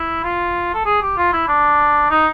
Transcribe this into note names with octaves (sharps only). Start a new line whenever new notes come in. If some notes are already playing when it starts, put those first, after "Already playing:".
Already playing: E4
F4
A4
G#4
G4
F4
E4
D4
D#4